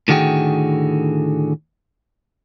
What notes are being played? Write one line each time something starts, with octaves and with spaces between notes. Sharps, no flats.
A2 D3 D#3 F#4 G#4 G5